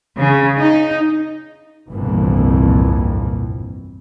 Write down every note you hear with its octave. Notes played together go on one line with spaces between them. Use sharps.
C#3
D#4
G1 C2 F2 A#2 E3